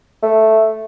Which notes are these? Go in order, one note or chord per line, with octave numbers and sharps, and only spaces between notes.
A3